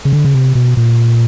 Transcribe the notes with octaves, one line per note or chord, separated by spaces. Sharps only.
C#3
D3
C#3
C3
B2
A#2